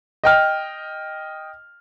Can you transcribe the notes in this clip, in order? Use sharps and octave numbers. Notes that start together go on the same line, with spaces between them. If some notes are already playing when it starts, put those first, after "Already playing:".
D#5 G5 F6